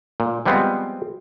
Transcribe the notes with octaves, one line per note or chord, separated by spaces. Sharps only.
A#2
F3 G3 G#3 B3 C4